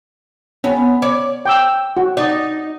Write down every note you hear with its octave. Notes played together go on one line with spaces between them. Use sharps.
B3 C#4
C#5 D5
G5 D6 E6
F#4
D#4 D5